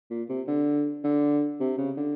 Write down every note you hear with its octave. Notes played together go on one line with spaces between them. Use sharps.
A#2
C3
D3
D3
C3
C#3
D3